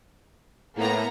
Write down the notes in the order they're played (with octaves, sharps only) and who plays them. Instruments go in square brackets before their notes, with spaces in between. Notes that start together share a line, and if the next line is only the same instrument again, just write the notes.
[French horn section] A2 [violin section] A#3 B3 A#5